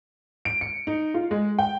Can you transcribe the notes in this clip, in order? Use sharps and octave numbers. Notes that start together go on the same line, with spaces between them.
D7
C#7
D#4
F4
G#3
G5